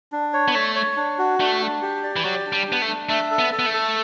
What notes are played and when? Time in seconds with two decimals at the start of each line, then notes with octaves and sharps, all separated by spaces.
0.12 D4
0.33 C#5
0.48 B3
0.55 A3 C#5
0.76 C#5
0.97 D4
1.18 F#4
1.40 A3 D4
1.61 D4
1.82 G4
2.03 D5
2.16 E3
2.25 F#3 G4
2.46 D4
2.53 G3
2.68 B3 D4
2.82 A3
2.88 D4
3.09 A3 E5
3.31 A4
3.39 B3
3.52 A4
3.59 B3
3.66 A3
3.74 A4